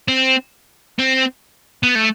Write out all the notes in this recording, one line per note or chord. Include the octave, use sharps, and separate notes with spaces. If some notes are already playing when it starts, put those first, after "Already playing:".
C4
C4
B3
A3